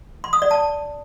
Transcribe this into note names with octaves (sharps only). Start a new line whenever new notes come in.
C6
D#6
D5
A5